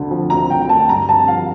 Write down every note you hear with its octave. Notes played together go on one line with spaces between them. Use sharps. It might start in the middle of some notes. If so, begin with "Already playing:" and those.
Already playing: D2 D3
F3
D2 A#5
D2 G5
D3 A5
G2 A#5
D3 A5
F3 F5